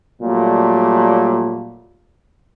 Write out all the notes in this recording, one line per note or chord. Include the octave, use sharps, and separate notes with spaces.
A#2 F#3 G3 A3